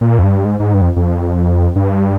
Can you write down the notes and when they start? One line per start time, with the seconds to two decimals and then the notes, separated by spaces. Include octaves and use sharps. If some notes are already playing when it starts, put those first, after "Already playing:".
0.01 A#2
0.19 F2
0.23 G2
0.45 G#2
0.60 G#2
0.74 G2
0.81 F2
0.96 F2
1.76 G2